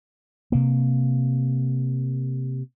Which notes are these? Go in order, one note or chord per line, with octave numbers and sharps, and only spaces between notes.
C3 A#3